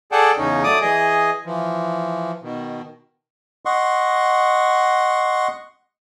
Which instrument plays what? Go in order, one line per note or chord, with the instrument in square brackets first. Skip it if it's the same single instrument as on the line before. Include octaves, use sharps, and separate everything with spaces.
[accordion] G#4 A4 D5 F#5 G5 A5
E2 C#3 C#4 D#4
F#3 A3 D5 D6 D#6
E3 G#4 D#5
E3 F3
B2 D#3
[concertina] D#5 F#5 C6 C#6